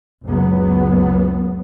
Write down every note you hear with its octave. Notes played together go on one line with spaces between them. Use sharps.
F#1 C#2 F#3 B3